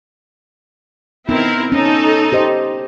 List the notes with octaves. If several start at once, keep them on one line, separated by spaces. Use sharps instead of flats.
B3 C4 D#4 E4 A#4
C#4 D#4 A4
G4 C5 D#5